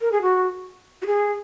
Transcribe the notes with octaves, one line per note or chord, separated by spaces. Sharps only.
A#4
G#4
F#4
F#4
G#4